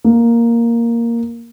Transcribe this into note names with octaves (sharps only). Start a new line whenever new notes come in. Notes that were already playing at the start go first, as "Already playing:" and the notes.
A#3